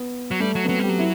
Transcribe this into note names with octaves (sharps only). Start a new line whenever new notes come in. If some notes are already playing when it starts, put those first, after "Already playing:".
Already playing: B3
F#3
G3 A3
F#3
B3
F#3 C4
G3 G4
F#3
E4